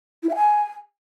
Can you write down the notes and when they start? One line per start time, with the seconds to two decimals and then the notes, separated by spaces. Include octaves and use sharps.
0.23 E4
0.29 E5
0.35 G#5